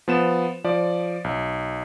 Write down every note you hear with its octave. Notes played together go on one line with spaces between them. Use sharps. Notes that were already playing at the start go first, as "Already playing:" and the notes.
F3 B3 E7
F3 D5
B1